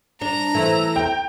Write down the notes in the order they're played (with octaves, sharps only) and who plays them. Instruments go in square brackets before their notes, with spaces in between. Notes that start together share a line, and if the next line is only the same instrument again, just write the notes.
[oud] D4 [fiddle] A#5
[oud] E3 A3 C4
[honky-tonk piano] G5